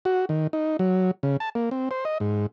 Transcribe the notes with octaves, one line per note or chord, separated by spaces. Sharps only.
F#4
D#3
D#4
F#3
C#3
A5
A#3
C4
C5
D#5
G#2